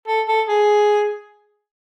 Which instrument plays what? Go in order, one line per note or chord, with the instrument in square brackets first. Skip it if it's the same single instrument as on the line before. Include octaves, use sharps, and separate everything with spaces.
[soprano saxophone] A4
A4
G#4